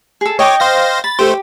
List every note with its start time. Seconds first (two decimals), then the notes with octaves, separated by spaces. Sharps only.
0.21 G#4 A4
0.39 C#5 D#5 G5 C#6 D6
0.60 C5 F5 A#6
1.04 B5 A6
1.19 A3 G4 C5